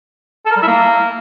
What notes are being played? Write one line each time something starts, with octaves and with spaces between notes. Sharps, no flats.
A4
A#4
G3
E4
A#3